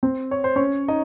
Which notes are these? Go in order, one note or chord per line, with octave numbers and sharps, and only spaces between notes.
C4 C5
C#5
C5
C#4 C#5
D#4 D#5